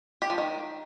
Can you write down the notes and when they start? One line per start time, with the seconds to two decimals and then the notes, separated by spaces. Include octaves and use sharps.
0.22 G4
0.30 F3
0.38 D#3